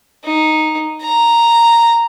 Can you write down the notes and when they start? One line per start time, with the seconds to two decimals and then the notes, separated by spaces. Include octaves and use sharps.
0.24 D#4
1.02 A#5